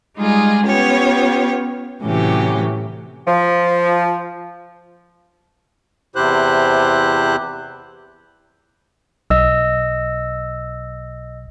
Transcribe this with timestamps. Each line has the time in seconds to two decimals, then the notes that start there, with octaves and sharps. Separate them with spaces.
0.16 G3 G#3 D#4 F4 G#4
0.65 B3 C#4 F4 G4 C#5
2.02 A2 C3 E3 F#3 C#4 G4
3.27 F3
6.16 E2 C3 E4 G4 C5 F#6
9.30 B1 D#5 E6